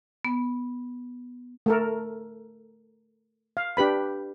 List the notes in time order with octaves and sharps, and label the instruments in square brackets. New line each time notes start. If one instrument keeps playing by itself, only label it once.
[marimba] B3
[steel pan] A3 A4 A#4
F5
D4 G4 B4 B5